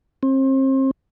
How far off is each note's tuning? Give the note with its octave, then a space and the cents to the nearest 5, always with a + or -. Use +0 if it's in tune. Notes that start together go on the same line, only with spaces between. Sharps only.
C4 +35